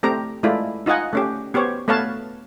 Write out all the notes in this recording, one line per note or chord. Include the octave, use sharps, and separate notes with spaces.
A3 C4 G4 A#5
G#3 A3 E4 F4 D5
D#4 F4 D#5 F#5 G#5
A3 C#4 G4
B3 G4 C5 C#5
A3 B3 B4 C#5 F5 A5